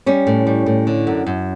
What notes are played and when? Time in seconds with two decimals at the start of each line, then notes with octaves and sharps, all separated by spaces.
0.06 G3 C#4
0.27 A2
0.47 G3
0.66 A2
0.87 D3
1.07 F#2
1.27 F#2